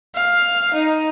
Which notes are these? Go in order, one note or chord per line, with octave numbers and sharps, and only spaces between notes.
F5
D#4